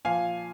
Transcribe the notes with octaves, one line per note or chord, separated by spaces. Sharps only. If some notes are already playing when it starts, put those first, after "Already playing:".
A#2 F3 F5 G#5